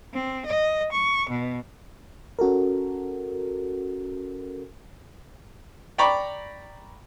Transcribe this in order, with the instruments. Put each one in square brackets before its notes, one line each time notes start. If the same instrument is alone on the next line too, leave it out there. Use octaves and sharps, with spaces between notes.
[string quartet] C4
D#5
C#6
B2
[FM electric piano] C#4 F#4 A4 A#4
[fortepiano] D5 G5 A#5 B5 C#6 D6